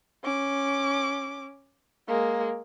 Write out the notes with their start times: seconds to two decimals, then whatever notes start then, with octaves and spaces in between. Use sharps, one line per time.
0.24 C#4 D6
2.07 G#3 A#3